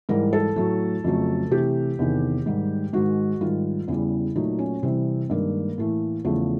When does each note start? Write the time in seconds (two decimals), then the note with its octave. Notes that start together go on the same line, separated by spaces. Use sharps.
0.09 G#2 E3 G3 A#4
0.33 A4
0.56 A2 F#3 A3
1.04 F2 C#3 F#3 A3
1.51 C3 E3 A3 G4
1.99 E2 C3 D#3
2.46 G#2 D#3 G3
2.93 G#2 D#3 G#3 F#4
3.41 G#2 D#3 G3 F4
3.88 E2 C#3 E3 G3 E4
4.35 A#2 F#3 A3 D#4
4.59 C#4
4.83 C3 E3 G3 C4
5.30 G2 D#3 G#3 A#3
5.78 A2 E3 A3
6.25 E2 C#3 F3 A3